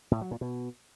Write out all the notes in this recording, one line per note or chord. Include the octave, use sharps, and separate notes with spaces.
A2
F#3
A#2
B2